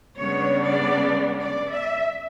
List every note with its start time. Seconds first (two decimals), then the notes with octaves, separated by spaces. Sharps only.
0.17 C#3 G3 B3 D4 C#5
0.63 D5
1.40 D5
1.71 E5